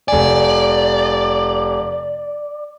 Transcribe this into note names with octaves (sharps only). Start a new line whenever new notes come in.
F1 D5 G#5